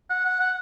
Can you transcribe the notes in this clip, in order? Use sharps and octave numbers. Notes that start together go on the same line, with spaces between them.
F#5
F#5
F#5